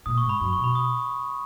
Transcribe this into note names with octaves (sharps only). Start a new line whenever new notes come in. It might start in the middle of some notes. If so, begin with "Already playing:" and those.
A#2 D#6
C#6
G#2
B5
F#2
C#6
B2
B5
D#6